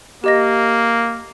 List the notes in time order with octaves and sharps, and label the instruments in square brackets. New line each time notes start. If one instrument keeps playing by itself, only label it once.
[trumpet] A#3 [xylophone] G4 D#5 A#6